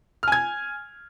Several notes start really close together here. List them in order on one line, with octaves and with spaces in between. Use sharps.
F6 G#5 G#6